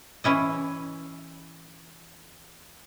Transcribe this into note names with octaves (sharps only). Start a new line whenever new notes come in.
E3 C#4 E4 D#5